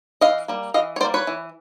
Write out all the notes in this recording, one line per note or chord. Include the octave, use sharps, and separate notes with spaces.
E3 D#5 F5
G3 A#3
E3 D#5 F5
C#5
G3 A#3 C5 D5
B4 C#5
E3